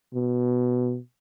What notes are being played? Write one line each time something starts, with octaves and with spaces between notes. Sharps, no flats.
B2